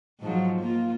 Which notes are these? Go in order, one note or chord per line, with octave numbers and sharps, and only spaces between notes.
G#2 F3 F#3
A#3 F4